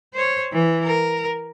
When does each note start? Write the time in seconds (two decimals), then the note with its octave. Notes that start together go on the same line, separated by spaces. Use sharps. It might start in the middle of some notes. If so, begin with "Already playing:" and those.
0.14 C5 C#5
0.53 E3
0.84 A#4